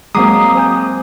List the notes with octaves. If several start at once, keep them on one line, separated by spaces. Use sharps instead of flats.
F#3 G#3 A#3 C4 A#5 D6 D#6 C7
C5 G#5 G6